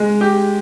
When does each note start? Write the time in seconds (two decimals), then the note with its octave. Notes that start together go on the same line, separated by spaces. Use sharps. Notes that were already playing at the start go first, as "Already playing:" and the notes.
Already playing: G#3
0.21 G4